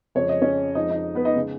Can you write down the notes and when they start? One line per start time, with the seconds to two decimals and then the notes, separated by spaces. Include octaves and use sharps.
0.15 F2 C#3 F3 G#3 C#5
0.29 D#5
0.42 C#4 C#5
0.75 F2 F3 G#3 D#4 D#5
0.90 D#4 D#5
1.15 B3 B4
1.25 D#4 D#5
1.36 C#3 G#3